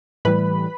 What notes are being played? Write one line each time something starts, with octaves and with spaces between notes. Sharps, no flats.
A2 E3 G3 B4 B5